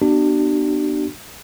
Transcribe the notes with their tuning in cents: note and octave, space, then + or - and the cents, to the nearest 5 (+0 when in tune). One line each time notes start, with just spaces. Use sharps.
B3 +0 D4 +30 F#4 +45